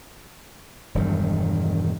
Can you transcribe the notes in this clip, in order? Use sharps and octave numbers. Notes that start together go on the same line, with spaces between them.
E1 G2 D#3